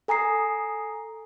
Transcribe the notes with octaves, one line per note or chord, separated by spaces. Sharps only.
A4 G#5 A#5 D#6 C7